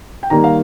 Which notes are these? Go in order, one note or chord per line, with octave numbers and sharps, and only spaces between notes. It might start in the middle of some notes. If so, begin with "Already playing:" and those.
G5
D#3 G3 A#3 A#5
F5